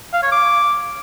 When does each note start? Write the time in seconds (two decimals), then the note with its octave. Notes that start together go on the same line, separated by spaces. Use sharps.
0.14 F5
0.23 C#5
0.32 D6